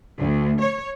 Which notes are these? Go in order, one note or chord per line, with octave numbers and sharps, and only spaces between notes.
D2
C#5